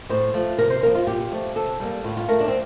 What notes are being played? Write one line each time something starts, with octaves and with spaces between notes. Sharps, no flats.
A2 C5
F3 A3
C3 A#4
C5
F3 A#3 A#4
F4
A#2 G4
F3 A3
C3 A4
G3 A#3
A2 F4
F4
A3 A#4
D4
C4